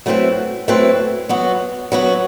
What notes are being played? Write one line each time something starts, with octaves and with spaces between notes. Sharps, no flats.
F#3 A3 C4 E4 B4
F#3 A3 C4 E4 B4
F#3 B3 F#4
F#3 B3 F#4